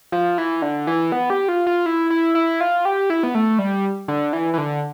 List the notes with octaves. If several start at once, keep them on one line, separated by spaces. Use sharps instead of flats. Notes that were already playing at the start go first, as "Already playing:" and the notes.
F3
E3
D3
E3
B3
G4
F4
F4
E4
E4
E4
F4
G4
E4
B3
A3
G3
D3
E3
E3
D3